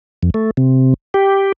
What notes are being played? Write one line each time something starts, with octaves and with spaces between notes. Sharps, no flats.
F2
A3
C3
G4